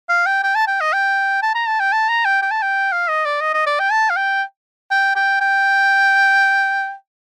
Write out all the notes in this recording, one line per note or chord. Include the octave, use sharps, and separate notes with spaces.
F5
G5
G5
A5
G5
D#5
G5
A5
A#5
A5
G5
A5
A#5
G5
G5
A5
G5
F5
D#5
D5
D#5
D#5
D5
G5
A5
F5
G5
G5
G5
G5